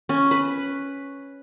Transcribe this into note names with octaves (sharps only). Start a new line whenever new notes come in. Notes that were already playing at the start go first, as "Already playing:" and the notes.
C#4
B4